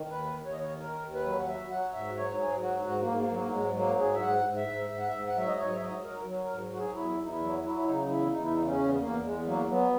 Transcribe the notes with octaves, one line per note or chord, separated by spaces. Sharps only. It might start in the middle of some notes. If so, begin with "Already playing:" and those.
Already playing: D#3
D#2 B4
D#2
C#5
D#5
D#3 C#5
D#3 A#4
D#2
B4
F#3
F#5
F#3 E5
F#3 F#5
G#2 E5
F#3 C#5
G#2 G#4
F#3 F#4
G#2 F#4
A#3
G#2
A#3
F#3
A#3
G#2 G#3
F#3 A#3
G#2 G#4
E5
G#2 F#5
G#2
E5
G#2
G#2 E5
F#5
E5
G#2
F#5
F#3 E5
D#5
G#2 C#5
E5
F#3 D#5
F#3 A#4
F#3
A#4
G#2
F#3 F#4
G#4
E2 E4
E2
D#4
E4
F#3
F#3 E4
E4
C#3 D#4
E2 E4
E2 D#4
E4
C#3 D#4
C#4
E2
E2 A#3
E2 G#3
F#3 A#3
F#3 B3